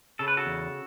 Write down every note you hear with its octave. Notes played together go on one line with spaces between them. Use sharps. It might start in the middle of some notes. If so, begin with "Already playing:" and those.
C#3 A4
B4
F#4 A4
E2